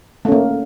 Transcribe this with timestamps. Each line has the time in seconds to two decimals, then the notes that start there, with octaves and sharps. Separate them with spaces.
0.25 A3
0.28 C#4
0.32 A#3